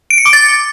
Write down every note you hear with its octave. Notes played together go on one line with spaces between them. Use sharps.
D7
C#7
D6
A6